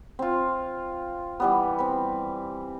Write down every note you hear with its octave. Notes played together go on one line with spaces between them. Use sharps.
C4 F4
E3 G3 B3
C4 B4